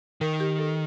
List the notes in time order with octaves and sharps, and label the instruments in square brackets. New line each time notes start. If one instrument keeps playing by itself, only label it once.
[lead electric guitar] D#3 [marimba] A#4
[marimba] G4
A4